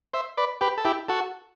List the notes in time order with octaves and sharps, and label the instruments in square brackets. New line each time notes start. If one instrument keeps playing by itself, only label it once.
[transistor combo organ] C5 E5
B4 D5
G4 B4
A4
E4 G4
F#4 A4